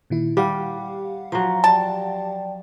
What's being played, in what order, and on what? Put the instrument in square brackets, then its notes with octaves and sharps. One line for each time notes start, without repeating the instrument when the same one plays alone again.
[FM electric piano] A#2 D#3 E4
[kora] G3 [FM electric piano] G4 F5 F#5
[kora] F3 F#3 [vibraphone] A#5
[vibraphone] D5 G5 [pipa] A5